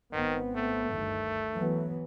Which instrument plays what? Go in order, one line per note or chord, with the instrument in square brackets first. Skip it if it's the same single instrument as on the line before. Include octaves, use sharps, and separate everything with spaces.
[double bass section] G#1 B3 C4 [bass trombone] D#3
[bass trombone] A3
[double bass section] G1 D2 D#3
E3 F#3 B3